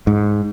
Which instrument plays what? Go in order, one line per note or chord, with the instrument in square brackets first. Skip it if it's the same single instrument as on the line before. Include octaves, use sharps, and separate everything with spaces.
[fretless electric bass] G#2